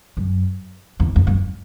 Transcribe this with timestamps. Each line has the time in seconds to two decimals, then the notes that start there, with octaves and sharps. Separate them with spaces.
0.17 F#2
1.00 E2
1.16 E2
1.27 F#2